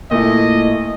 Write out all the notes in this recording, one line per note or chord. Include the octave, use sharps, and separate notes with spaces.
A#2 A3 E4 D#5